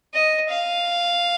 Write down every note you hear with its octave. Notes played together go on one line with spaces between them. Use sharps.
D#5
F5